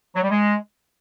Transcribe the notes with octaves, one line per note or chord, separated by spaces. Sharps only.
F#3
G3
G#3